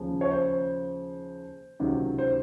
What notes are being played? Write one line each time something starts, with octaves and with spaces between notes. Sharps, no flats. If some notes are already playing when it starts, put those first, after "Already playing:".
Already playing: D#2 C#3 F3
C#5
C5
C#2 C3 D#3 F#3
C5